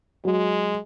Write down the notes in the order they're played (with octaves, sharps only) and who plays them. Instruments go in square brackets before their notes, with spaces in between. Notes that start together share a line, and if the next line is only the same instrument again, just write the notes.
[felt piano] F#3 [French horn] G#3